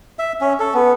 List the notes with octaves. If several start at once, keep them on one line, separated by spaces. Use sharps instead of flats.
E5
C#4
A4
B3